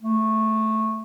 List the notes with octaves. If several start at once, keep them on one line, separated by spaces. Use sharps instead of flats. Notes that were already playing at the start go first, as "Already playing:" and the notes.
A3